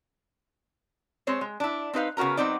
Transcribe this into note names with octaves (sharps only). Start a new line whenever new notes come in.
G#3 C4 C5 C#5
G#3
D4 E4
C4 D#4 B4 F5
C#3 B3 F#4 A#4 A#5
F#3 B3 C4 D#4 D5